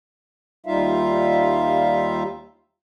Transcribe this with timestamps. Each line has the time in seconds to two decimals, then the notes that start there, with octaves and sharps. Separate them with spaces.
0.66 D#2 G3 D#4 F4 E5 F5